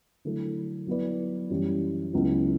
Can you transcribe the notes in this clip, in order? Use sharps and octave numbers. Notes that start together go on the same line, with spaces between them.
D3 F#3 A3 E4 A4
F#3 B3 E4 B4 D5
F#2 E3 G3 C#4
C#2 C#3 F#3 B3 E4